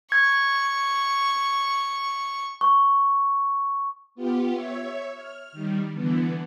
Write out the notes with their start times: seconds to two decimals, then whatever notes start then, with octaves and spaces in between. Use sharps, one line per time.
0.12 C#6 G#6
2.61 C#6
4.15 B3 F4 G4
4.52 C#5 E5
5.13 F6
5.52 D#3 G3
5.93 D3 E3 B3